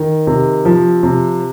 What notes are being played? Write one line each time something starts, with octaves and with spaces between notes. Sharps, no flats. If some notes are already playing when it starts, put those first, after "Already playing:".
Already playing: D#3
C3
F3
C3